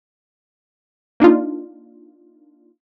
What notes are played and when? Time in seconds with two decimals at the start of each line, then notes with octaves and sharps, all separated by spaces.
1.20 A#3 D4 D#4 F4